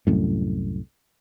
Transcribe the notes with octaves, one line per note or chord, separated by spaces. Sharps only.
C2 F#2 A2